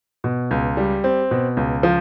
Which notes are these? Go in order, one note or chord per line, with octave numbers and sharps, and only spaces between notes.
B2
C#2
G3
C4
B2
C#2
F3